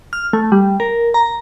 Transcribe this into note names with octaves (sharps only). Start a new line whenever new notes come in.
F6
A3
G3
A#4
A#5